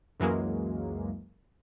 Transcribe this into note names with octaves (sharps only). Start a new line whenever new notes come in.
C#2 F#2 E3 F#3 G#3 A#3